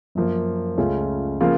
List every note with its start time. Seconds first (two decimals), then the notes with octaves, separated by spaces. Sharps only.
0.15 F#2 F3 A#3
0.78 C#2 C#3 A3 C#4 F4
1.41 C#3 F3 A#3 F4